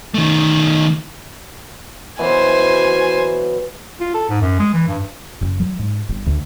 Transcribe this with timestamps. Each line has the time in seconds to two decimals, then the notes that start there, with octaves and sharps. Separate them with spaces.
0.14 D#3 A3
2.19 B2 E3 F#3 C5 G#5
4.00 F4
4.14 A4
4.29 G#2
4.42 F#2
4.60 G#3
4.73 E3
4.88 G2
5.41 F#1
5.60 F#3
5.79 G#2
6.09 G1
6.26 D2